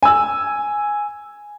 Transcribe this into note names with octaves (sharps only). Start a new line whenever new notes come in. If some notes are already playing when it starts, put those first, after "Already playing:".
G#5 E6